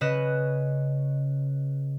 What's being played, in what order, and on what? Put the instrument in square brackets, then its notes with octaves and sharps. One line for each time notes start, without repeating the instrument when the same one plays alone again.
[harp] C#3 C#4 B4 D#5 F#6 E7